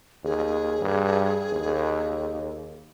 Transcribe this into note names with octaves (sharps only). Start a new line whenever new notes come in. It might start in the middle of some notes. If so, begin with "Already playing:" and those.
D#2 G#4
G2
D#2